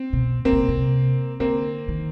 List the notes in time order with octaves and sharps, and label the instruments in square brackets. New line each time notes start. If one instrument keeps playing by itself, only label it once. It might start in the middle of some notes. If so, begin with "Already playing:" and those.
Already playing: [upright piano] C4
[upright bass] B2
[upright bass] C3 [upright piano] A#3 C4
[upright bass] B2
A#2
B2
C3
[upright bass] D3 [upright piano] A#3 C4
[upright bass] D#3